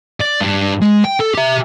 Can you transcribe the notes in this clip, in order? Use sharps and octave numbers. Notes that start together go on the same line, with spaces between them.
D5
G2
G#3
G5
A4
G4 E5